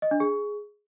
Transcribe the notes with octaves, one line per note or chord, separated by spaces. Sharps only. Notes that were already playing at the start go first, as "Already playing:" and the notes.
D#5
D4
G#4